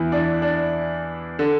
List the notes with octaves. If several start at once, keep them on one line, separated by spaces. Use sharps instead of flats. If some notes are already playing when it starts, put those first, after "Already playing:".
Already playing: E2 E3 E4
D4
D4
D3